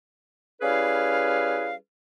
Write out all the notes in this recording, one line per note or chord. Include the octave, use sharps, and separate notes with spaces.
G3 C#4 E4 G#4 B4 F5